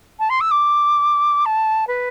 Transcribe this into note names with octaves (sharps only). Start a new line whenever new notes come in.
A5
C6
E6
D6
A5
B4